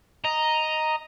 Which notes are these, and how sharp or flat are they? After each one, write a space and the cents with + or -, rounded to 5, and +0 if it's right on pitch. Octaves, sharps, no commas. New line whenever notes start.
D#5 +0 A#5 +0